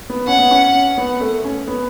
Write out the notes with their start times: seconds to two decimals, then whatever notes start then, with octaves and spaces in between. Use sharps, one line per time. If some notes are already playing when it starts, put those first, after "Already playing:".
0.10 B3
0.27 C#4 F#5
0.39 B3
0.51 C#4
0.98 B3
1.21 A3
1.44 C#4
1.68 B3